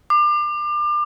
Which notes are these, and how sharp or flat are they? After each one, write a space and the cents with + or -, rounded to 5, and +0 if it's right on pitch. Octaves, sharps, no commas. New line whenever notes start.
D6 +30